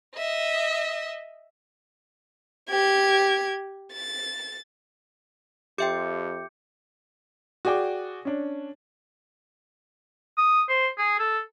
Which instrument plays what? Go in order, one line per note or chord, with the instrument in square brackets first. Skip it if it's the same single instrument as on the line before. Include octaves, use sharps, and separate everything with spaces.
[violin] D#5 E5
G4 G#6
A6
[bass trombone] F2 [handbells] G4 E5 G5 [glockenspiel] D6 G6 C#7
[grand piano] F#4 G#4 D5 G5 D6
C#4 D4
[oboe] D#6
C5
G#4
A4